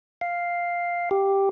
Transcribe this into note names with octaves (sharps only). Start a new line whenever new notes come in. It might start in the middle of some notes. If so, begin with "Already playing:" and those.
F5
G4